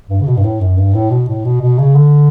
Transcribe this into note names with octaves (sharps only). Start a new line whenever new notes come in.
G2
C#3
B2
G2
A2
F#2
G2
A2
B2
A2
B2
B2
C#3
D3